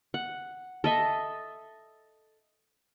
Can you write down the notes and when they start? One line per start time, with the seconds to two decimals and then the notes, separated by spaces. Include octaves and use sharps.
0.14 F#5
0.84 A4 D#5 E5